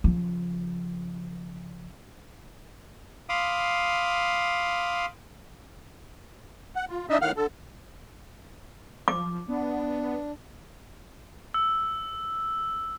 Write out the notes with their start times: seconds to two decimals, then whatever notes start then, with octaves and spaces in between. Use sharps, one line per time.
0.04 C#3 F3
3.29 F5 B5 C6 D6 D#6
6.76 F#5
6.89 F4
7.09 D4 D#4 D#5 E5
7.21 A2 D#3 F5 F#5 F6
7.37 D3 A4
9.08 F3 D6
9.48 B3 D4
11.54 E6